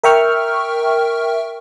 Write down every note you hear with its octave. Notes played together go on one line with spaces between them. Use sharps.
A#4 E5 G5 C#6 F6